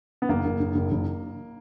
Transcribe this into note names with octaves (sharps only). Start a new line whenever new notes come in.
B3
F#1 A#3
F#1
F#1
F#1
F#1